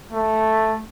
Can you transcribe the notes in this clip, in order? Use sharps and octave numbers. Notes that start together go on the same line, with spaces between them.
A3